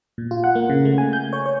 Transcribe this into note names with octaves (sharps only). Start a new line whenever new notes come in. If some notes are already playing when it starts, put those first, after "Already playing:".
A#2
F4
F#5
A#3
C#3
A3
G#5
G6
C#5
C#5